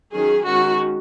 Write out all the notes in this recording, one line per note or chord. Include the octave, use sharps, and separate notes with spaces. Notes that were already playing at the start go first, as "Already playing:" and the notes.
D#3 F#3 C#4 G#4
D#3 G#3 C#4 F#4